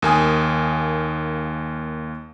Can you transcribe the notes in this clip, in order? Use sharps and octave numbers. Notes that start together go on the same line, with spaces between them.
D#2 A#3 G#5 D#6